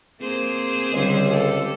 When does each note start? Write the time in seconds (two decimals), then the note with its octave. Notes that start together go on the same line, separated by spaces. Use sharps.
0.21 A#3 C4 G#4 C5
0.93 C#2 D3 G3
1.26 G4 A4